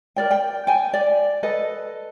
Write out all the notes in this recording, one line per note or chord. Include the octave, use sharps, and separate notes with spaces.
A#4 D5 G5
G5
G5 G#5
D5
A4 B4 D#5